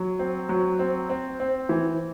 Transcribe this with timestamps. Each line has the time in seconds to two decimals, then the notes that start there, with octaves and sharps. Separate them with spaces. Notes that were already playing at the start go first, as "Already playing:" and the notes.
Already playing: F#3
0.19 C4
0.49 F#3
0.79 C4
1.09 C4
1.40 C4
1.69 E3